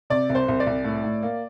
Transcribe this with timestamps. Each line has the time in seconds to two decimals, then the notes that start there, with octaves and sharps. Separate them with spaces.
0.10 C3 D5
0.30 C2
0.35 C5
0.48 C2
0.60 D5
0.67 C2
0.84 A2
1.04 A2
1.23 A#3